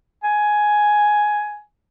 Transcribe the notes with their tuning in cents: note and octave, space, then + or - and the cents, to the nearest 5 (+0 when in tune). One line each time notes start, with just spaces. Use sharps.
G#5 +10